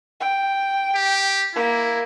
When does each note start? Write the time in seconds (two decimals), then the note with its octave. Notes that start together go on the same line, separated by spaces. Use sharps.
0.20 G5
0.95 G4
1.55 A#3 E4